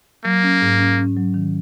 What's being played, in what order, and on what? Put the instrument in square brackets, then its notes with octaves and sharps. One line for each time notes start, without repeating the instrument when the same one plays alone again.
[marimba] F#3 [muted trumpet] A#3
[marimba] C#4
G#2
C#4
C#4
F#3
D#3